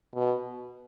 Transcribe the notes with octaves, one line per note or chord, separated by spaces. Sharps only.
B2